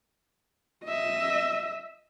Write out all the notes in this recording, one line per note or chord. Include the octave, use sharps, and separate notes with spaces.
D#5 E5